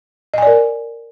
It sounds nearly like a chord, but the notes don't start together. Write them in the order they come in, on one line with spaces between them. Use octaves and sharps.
D#5 G#5 D5 A#4